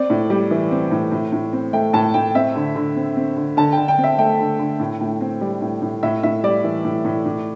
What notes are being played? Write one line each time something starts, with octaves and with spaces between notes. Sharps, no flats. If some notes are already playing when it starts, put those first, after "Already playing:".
Already playing: C4 D5
A2
G3
E3
C4
A2
A2
A2
C4
A3 G5
A2 A5
A2 G5
C4 E5
D3
D3
C4
C4
D3
D3 A5
D3 G5
G5
C4
E5
A3 G5
D3
D3
A2
A2
C4
G3
A2
A2
A2 E5
A2 E5
G3 D5
E3
A2
A2
A2